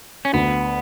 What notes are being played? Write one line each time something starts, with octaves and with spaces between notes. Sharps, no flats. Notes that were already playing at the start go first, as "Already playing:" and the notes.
C#4
D2 B3